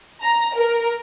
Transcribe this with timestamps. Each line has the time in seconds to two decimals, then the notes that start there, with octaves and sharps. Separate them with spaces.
0.22 A#5
0.55 A#4